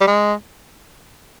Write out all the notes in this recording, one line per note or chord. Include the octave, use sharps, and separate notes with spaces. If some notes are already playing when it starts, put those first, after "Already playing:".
G3
G#3